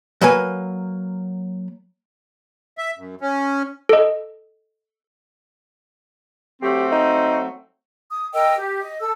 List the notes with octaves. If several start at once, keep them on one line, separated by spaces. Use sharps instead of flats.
F#3 A#3 B4 G#5
E5
F#2
C#4
A4 D#5
F#3 A3 C4 G4
D#4
D#6
A#4 D#5 G5 E6
G4
D#5
A4 E6